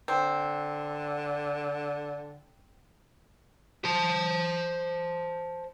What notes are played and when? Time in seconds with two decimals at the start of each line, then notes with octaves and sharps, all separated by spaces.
0.08 D3 C4
3.85 C5 A5